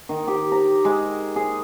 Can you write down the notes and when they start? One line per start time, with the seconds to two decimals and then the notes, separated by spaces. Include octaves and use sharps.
0.09 D#3
0.28 G4
0.52 A#5
0.85 G#3
1.36 G#4